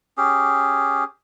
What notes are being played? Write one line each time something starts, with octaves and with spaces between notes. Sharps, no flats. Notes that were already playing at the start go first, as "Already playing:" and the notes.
C#4 G4 G#4